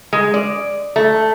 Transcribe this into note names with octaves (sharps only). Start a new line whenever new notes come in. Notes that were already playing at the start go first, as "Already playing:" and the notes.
G#3
D5
A3